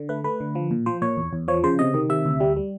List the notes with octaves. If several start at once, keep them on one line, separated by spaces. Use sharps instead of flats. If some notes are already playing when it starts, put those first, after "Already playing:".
Already playing: D3
A3 B4
A3 B4
D3
F3
A#2
F3 C5
A#2 C#5
E2
E2
F3 C#5
C#3 C5
C3 D#5
D#3
C3 E5
D2
G3
G3